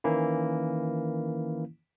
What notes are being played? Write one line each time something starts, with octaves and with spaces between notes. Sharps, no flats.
D#3 E3 A#3 C#4 E4